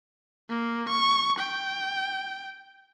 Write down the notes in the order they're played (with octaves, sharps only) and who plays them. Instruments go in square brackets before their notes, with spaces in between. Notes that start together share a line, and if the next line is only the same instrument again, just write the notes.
[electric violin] A#3
C#6
G5